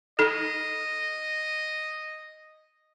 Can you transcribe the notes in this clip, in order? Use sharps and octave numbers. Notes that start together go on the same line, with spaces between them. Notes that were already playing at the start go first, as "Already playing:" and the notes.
D#4 A4 D#5